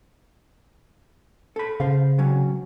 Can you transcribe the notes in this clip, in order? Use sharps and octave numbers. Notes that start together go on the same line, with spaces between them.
A4 B5
C#3 C5 F5
C3 F#3 C#4